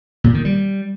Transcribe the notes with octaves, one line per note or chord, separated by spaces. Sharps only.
A#2
D#3
G3